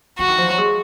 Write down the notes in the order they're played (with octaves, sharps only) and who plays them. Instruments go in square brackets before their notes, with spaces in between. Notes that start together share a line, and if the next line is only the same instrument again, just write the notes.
[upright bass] D3 [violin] F#4
[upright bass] D#3
F3
F#3
G#3